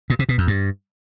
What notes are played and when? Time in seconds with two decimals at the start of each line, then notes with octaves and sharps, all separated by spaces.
0.10 A#2
0.19 C3
0.29 B2
0.38 F2
0.48 G2